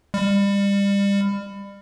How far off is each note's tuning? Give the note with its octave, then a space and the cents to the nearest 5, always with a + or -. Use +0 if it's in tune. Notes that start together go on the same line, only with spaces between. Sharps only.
G3 +30